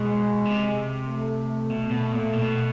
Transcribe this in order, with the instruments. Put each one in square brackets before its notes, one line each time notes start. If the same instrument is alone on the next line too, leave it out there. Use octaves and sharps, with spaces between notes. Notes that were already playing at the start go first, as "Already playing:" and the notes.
Already playing: [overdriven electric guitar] B2 [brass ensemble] G#3
[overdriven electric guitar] C3
[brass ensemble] A3
[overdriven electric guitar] B2
B2
A#2
B2